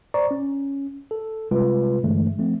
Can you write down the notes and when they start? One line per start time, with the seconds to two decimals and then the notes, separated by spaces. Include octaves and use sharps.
0.14 C5 D5 A#5 C#6
0.31 C#4
1.11 A4
1.51 C3 G3 G#3 F4 B4
2.03 G2 D3 E3 G#3 A3
2.39 F3 A3 C4